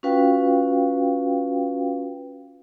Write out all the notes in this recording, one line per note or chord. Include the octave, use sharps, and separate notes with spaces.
C#4 F4 F#4 B4 F5 G5